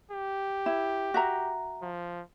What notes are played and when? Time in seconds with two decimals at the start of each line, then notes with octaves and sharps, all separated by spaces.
0.11 G4
0.66 E4
1.14 F#4 E5 A#5
1.82 F3